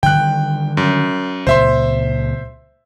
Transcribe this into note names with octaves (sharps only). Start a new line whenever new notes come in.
D3 D#3 G3 G5 F#6
F#2
C#2 A#2 C5 E5 C6